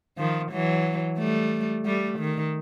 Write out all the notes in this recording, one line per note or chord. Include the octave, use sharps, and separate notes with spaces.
D#3 F3
E3 F#3
G3 A3
G3 A3
D#3